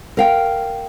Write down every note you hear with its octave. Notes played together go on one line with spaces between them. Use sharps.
A#4 F5 G5